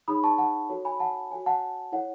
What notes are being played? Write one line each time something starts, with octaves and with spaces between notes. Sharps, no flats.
D#4 G#4 C#5 B5 D#6
A5 C#6
F#5 A5
F#4 A4 C#5
G#5 B5
F#5 A5
F#4 A4 C#5 G#5
F#5 A5
E4 A4 C#5 F#5